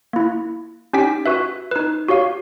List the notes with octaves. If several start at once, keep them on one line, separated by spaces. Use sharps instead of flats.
A#3 E4
C#4 D#4 G4 G5 B6
F#4 B4 E5
D#4 B4
F#4 G4 C#5 F5